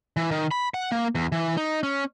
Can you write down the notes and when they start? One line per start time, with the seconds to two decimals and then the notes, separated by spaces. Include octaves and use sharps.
0.17 E3
0.31 D#3
0.51 B5
0.74 F#5
0.92 A#3
1.15 E2
1.32 E3
1.57 D#4
1.83 C#4